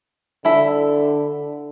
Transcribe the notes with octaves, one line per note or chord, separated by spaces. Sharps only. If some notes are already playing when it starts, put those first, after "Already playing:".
D3 E4 A4 E5